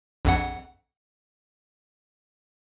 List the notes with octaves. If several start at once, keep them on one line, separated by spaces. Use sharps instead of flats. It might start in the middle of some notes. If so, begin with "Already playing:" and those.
A#1 F2 F#5